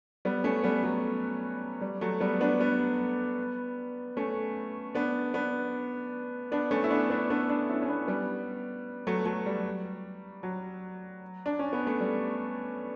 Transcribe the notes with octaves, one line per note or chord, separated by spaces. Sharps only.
G3 B3
A3 C#4
G3 B3
F#3 A3
G3
F#3 A3
G3 B3
B3 D4
G3 B3
A3 C#4
B3 D4
B3 D4
B3 D4
A3 C#4
E4
B3 D4
B3 D4
B3 D4
B3 D4
C#4 E4
C#4
B3 D4
G3 B3
F#3 A3
F#3 A3
G3
F#3
D4
C#4
B3
A3
G3